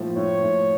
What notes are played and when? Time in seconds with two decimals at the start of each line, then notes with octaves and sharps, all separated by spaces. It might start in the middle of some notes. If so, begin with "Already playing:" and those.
Already playing: A2 F3 A#3
0.16 A2 C#5
0.43 A2